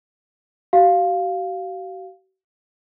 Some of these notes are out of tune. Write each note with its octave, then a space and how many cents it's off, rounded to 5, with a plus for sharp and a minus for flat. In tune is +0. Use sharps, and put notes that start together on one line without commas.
F#4 +45 F5 +0